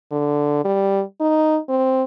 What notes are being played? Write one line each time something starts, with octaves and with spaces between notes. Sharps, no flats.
D3
G3
D#4
C4